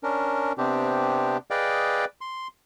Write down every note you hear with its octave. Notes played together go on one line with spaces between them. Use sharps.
C#4 D4 A#4
C3 B3 C4 D4 G4
G#4 B4 D5 D#5 F5 G5
C6